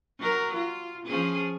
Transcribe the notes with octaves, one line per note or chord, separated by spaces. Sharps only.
F#3 A#4
F4
F3 C#4 G#4